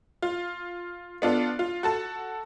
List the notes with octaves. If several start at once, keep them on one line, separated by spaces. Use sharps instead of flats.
F4
B3 D4 F4 A4
F4
F#4 A4 A5